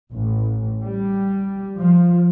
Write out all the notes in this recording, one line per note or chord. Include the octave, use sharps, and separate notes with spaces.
A1
G3
F3